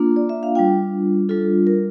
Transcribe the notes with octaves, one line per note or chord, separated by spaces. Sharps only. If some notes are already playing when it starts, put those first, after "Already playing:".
Already playing: A#3 D4 F4
D5
E5
F5
G3 D4 F4 G5
G3 D4 F4 A4
A#4